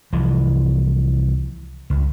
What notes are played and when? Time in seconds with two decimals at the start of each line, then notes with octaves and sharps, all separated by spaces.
0.13 C2 E3 F3
1.90 C#2